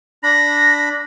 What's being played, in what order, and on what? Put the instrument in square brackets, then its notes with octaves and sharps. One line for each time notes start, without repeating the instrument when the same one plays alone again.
[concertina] D4 B5 [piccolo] A#6